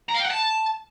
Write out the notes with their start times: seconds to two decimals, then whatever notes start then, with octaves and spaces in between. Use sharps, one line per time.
0.09 A#5
0.14 F5
0.20 G5
0.25 F#5
0.30 A5